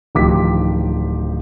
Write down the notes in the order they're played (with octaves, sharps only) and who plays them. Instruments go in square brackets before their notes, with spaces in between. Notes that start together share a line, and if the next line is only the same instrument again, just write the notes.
[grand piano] D1 D#3 F3 G4 D6 B6